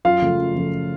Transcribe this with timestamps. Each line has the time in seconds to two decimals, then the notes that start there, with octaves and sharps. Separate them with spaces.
0.05 F#2 F4 F5
0.22 C#3 F3 A3
0.38 F#2
0.55 C#3 F3 A3